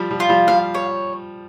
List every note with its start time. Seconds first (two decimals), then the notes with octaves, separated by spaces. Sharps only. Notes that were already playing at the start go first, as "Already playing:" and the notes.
Already playing: F3 G3
0.11 F3 G3
0.20 F4
0.29 F3 G3
0.48 F3 G3 F5
0.75 C#5